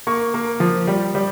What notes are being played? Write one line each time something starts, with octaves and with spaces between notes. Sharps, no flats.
A#3 C#6
A#3
F3
G3
G3